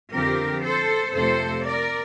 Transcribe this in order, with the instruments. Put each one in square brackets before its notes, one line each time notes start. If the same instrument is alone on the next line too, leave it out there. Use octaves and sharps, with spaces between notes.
[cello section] F2 D3 F3 C4 G4 A#4
A4 C5
F2 C3 F3 A3 C4 A4 C5
A#4 D5